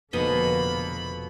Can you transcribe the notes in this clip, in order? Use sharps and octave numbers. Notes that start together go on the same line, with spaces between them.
F1 B2 D3 A#3 D#5 B5